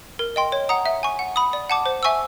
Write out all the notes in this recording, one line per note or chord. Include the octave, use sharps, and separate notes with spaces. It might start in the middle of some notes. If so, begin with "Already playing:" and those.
A#4
D#5 G5 C6
C#5
F#5 A#5 D#6
E5
G#5 C#6
F#5
B5 D#6
D5
F#5 A5 D6
C5
E5 G#5 C#6 E6